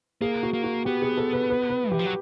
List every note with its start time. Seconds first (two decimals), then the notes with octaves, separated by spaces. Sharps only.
0.21 A#3 G#4
0.43 F#4
0.53 A#3
0.64 F#4
0.85 B3 G4
1.02 G#4
1.17 A4
1.33 B4
1.50 B4
1.70 B4
1.91 E3 G4
1.99 F3
2.06 F#3